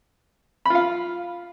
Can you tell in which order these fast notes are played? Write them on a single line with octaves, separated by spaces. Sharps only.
B5 F4 F5